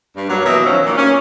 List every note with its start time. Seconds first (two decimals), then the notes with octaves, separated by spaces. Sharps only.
0.16 G2
0.28 F#3 A#3
0.44 B2 E3 D#5 E5
0.64 D#3 F3 F#3 C#4
0.85 A#2 A#3
0.97 C#4